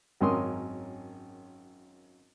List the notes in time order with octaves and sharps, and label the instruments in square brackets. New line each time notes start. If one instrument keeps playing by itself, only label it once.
[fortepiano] G#1 F#2 C#4 A#4 C6 D#6